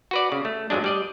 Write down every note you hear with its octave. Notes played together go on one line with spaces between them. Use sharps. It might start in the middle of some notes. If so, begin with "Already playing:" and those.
F#4 B4 D5
C#3
A3
G1 D2 F#3 G#3 D4
G3 D5 D#5